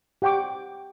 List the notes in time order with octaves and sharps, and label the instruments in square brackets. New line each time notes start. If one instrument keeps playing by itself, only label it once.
[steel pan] G4 F#5 G5 C#6 D6